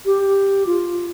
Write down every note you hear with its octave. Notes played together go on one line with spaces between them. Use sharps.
G4
F4